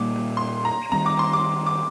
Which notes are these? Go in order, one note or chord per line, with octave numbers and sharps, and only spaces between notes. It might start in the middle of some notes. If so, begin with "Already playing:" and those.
Already playing: A#2 G3 A#3 D6
C6
A#5
D#3 G3 C4 A#5
D6
C6
D6
D6